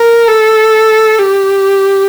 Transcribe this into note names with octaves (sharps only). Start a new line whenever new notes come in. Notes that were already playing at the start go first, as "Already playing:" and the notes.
Already playing: A#4
A4
G4